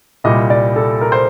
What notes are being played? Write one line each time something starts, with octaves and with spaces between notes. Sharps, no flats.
C2 A#2 G3 D#5
D5
A4
A#4
C5